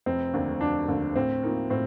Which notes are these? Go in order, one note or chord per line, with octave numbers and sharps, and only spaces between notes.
F1 C4
D#2 D3 A3 D4
F1 D4
D#2 D3 A3 D4
A2 C4
F3 A#3 D#4 A#4
A2 C4